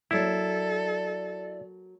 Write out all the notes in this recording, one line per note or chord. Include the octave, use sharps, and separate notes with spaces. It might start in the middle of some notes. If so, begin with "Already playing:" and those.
F#3 A#3 E4 A4 D5